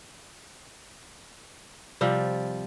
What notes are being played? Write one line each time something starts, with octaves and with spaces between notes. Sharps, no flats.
C3 F3 G3